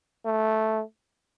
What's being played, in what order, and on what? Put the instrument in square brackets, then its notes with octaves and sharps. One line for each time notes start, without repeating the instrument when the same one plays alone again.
[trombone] A3